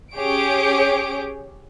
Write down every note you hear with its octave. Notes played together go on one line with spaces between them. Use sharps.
C#4 G4 G#4 C#5 D7